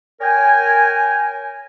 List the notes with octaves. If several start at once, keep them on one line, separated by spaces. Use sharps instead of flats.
A#4 C#5 G5 G#5